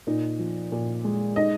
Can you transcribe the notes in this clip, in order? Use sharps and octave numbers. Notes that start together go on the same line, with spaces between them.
A#2 D#4
F3
A#2
G#3
D#4 D#5